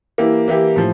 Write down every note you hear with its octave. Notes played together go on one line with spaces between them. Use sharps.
E3 A#3 E4 G4
E3 A#3 E4 G4
A2 F3